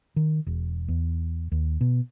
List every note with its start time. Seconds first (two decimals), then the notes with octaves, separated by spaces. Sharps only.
0.16 D#3
0.47 E1
0.88 E2
1.52 D#2
1.81 B2